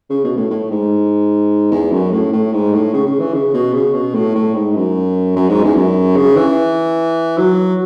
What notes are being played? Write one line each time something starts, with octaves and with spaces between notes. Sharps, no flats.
C#3
B2
A2
A2
G#2
E2
F#2
A2
A2
G#2
A2
C#3
C#3
E3
C#3
B2
C#3
B2
A2
A2
G#2
F#2
F#2
G#2
E2
F#2
C#3
E3
F#3